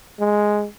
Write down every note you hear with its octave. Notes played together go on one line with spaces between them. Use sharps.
G#3